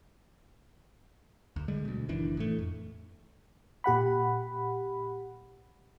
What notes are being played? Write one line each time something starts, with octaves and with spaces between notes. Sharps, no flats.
D2
D3 G3 G#3
D2 B2
F#1 D#3 E3 D4
A2 E3 A3
F2
A#2 G4 F#5 B5